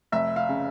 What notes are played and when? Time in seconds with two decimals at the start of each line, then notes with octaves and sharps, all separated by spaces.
0.12 F1 E5
0.36 F5
0.49 C#3